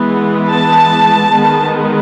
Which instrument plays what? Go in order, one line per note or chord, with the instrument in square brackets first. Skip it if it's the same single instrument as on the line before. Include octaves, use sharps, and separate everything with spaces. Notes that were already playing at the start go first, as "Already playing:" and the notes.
Already playing: [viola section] E3 G#3 B3
A5
D#3 G#3 B3